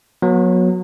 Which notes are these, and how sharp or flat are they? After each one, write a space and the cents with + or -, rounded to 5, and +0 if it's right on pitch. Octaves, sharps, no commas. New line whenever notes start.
F#3 -20 B3 -35